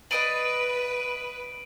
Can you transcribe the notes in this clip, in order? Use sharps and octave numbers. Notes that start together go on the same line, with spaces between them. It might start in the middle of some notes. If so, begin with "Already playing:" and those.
B4 D5 D#5 F5 D7 D#7 F#7